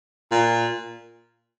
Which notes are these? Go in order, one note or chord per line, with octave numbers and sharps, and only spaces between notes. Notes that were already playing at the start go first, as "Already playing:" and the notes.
A#2